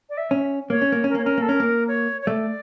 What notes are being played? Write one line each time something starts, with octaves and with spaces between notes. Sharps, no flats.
D5
E5
C#4
A#3 C#5
C#4
A#3
C#4
A#4
A#3 C#5
C#4 A#4
A#3 A4
C#4 A#4
A#3
C#5
C#5
A3 D5